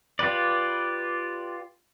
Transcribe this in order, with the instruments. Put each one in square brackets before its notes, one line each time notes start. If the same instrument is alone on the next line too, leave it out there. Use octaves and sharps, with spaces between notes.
[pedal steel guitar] F4 G4 B4 D5